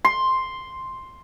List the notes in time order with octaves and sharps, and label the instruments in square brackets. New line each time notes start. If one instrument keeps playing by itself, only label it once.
[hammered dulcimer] C6